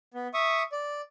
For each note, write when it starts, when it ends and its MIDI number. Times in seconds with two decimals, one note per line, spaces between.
0.14 0.27 59
0.34 0.63 76
0.34 0.63 85
0.34 0.63 87
0.72 1.01 74